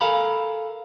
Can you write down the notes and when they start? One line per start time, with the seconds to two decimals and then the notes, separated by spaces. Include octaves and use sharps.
0.01 A4 A#4 F5 G#5 A#5 B5